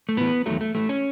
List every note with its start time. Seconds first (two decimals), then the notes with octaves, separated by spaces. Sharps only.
0.09 A3
0.17 A2 E3 B3
0.46 E2 D#3 F#3 A3
0.61 A3
0.75 A2 E3 A3
0.89 C#4